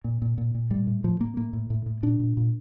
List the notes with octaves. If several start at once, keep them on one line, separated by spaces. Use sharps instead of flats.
A#2
A#2
A#2
A#2
A2 G3
A2
A2 F3
A2 A#3
A2 A#3
A2
A2
A2
A#2 D4
A#2
A#2